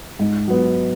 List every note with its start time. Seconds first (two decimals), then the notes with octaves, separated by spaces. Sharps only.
0.19 G#2
0.48 F#3 B3